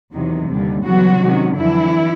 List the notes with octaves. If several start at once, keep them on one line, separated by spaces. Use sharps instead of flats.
E2 C3 D#3 F#3
D#2 D3 G3
C#3 E3 F#3 G3 B3 F#4
C3 D#3 G#3 C#4
F2 D3 E3 F#3 E4